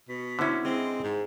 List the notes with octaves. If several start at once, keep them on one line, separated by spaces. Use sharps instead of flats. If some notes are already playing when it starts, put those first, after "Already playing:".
B2
D3 C4 C#4 E4
G#3 C4 D#5
G#2